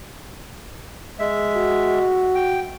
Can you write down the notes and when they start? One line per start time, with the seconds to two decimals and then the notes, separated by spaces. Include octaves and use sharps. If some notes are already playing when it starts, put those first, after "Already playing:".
1.19 G#3 E5
1.56 F#4
2.35 G5